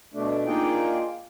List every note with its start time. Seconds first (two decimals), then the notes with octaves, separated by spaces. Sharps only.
0.14 B2 A3 D4
0.46 A#3 D4 D#4 F4 G#4 G5